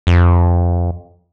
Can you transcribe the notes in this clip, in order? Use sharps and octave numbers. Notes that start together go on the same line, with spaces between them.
F2